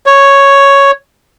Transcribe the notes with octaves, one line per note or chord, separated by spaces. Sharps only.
C#5